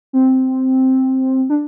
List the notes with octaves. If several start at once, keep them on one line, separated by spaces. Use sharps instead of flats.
C4
D4